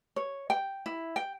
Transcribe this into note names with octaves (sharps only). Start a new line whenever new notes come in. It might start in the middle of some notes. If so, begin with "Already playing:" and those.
C#5
G5
E4
G5